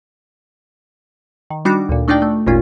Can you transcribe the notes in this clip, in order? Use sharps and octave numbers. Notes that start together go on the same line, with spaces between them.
D#3
G3 D4 D#4 F#4 D6
D2 A#2
A3 D4 D#4 F4 D5 G5
A3
G#1 D#2 A#2 C#4 F4